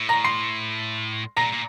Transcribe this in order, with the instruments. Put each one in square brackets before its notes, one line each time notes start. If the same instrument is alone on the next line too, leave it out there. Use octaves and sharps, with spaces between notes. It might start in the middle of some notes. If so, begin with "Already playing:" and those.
Already playing: [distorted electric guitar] A2
[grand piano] A#5 A#6
C6 C7
[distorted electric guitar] A#2 [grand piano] A#5 A#6
[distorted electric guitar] A#2